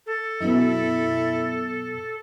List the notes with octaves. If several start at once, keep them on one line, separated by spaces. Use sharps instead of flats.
A4
F#2 B2 E4